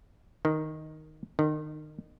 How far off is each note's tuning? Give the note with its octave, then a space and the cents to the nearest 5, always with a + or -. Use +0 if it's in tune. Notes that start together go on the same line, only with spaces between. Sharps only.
D#3 +0
D#3 -30